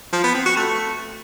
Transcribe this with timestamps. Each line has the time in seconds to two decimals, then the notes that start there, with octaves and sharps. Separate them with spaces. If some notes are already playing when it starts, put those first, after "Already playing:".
0.13 F3
0.24 B3
0.35 C4
0.46 F#4
0.56 A3